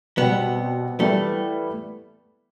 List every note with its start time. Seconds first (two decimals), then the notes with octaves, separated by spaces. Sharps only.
0.18 B2 G3 B3 C4
1.00 E3 G3 A3 B3 E4